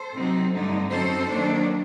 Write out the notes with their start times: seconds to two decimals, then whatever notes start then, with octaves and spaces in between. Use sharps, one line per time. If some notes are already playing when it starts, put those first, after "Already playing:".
Already playing: A4 C5
0.15 C3 F#3 C4 D#4
0.54 G2 D3 A3 D#4
0.91 F#2 F#3 C4 D#4 A4 C5
1.29 D#3 F#3 A#3 D4